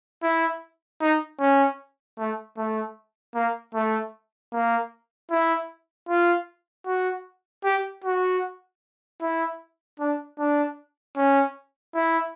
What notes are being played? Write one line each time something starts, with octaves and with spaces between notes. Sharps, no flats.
E4
D#4
C#4
A3
A3
A#3
A3
A#3
E4
F4
F#4
G4
F#4
E4
D4
D4
C#4
E4